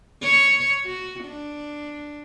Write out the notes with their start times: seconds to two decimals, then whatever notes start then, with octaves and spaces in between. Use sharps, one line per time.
0.23 C#5
0.85 F#4
1.24 D4